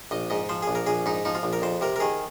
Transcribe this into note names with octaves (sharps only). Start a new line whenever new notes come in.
A#1 D#5
G#2 D#5
F3 C5
G#4
A#1
A#4
A#1 G#4
G#2 D#4
F3 D#4
F4
A#1
A#4
F2 C5
C3 A#4
A#4
D#3 G#4